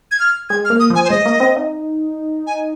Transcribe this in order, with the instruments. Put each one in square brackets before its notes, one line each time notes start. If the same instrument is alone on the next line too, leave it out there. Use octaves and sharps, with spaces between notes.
[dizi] G#6
F6
[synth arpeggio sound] G#3 [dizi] G#6
[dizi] F6
[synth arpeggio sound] A#3
[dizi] D#6
[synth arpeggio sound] F3 [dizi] G#5
[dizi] C5
[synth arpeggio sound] G#3 [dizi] D#5
[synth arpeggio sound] A#3
C4
D#4
[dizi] G#5